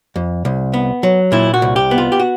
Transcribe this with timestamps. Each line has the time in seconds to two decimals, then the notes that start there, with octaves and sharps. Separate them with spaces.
0.16 F2
0.45 C2
0.73 B3
1.03 F#3
1.32 A#2 E4
1.54 F#4
1.62 C2
1.76 G4
1.91 B3
1.98 F4
2.12 G4
2.19 F#4